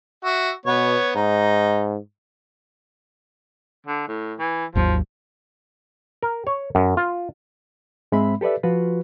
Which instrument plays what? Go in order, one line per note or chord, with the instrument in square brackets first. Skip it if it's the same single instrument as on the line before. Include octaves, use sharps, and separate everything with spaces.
[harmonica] F#4 E5
[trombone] B2 [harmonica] B3 C#5
[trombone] G#2 [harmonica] D#4
[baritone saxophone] D3
A2
E3
[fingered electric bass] G#1 D#2 F#3 [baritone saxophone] F3
[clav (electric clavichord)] A#4
C#5
F#2
F4
[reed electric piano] G#2 G#3 C4 E5 B5
G4 A4 B4 D5 E5
F3 F4 F#4 B4